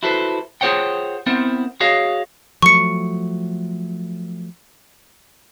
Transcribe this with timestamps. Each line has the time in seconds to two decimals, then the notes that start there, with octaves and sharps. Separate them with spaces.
0.03 E4 F#4 A4 B4 C5
0.61 F4 G#4 C5 C#5 F#5 G5
1.26 B3 C4 E4 A#4 C5 F#5
1.80 F#4 G#4 C#5 D#5 F5
2.62 F3 F#3 A3 C#6 C#7